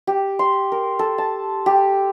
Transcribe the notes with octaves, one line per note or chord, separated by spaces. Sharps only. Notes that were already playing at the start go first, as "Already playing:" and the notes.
G4
C6
A#4
A4
A5
G4